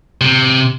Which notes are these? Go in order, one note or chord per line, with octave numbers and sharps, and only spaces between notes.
C3